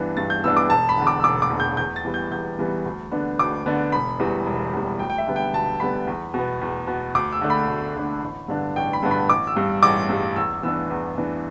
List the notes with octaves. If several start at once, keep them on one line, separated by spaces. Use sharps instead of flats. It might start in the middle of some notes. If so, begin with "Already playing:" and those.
Already playing: G2 E3 B3 D4
G2 A6
G6
E3 B3 D4 E6
D6
E1 A5
B5
E2 D3
D6
E6
E1 D6
D6
E2 D3
G6
E2 G6
A6
E3 G3 B3
G6
E2 G6
E3 G3 B3
D2
D3 B3 D4
D2 D6
D3 B3 D4
E1 B5
E2 E3 G3
E1
E2 E3 G3
D2 G5
G5
E5
D3 G3 B3
G5
D2 A5
D3 G3 B3 B5
E2
B2 B3
E2
B2 B3
D2 D6
E6
D3 A3 D4
B5
D2
D3 A3 D4
A1
G2 D3 B3 D4
A1 G5
B5
G2 D3 B3 D4
B5
A1 D6
E6
G2 G3
A1 D6
G2 G3
E2 E6
E3 B3 D4 E6
E2
E3 B3 D4